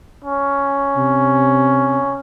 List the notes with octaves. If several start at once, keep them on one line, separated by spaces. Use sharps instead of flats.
C#4
C3